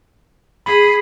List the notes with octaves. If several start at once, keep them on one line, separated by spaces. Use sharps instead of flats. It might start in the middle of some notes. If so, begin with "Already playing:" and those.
G#4 B5 B6